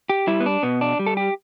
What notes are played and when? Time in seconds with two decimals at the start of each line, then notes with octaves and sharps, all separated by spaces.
0.10 G4
0.27 G3 E4
0.40 B3
0.46 D4
0.63 B2 B3
0.81 D4
0.99 G3
1.06 A4
1.17 G4